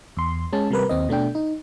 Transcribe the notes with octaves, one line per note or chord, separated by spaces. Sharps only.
E2 C6
G#3 C#4 A5
C3 G3 A#4 B4
D#2 C4 D#5
B2 A3 D4 G5
D#4